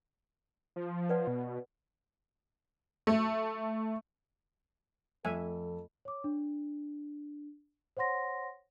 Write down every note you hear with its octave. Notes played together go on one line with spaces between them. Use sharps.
F3
B4 D5 F#5
B2
A3
F2 A3 A4 E5 G#5
C#5 D6
D4
C5 C#5 F#5 C6 A#6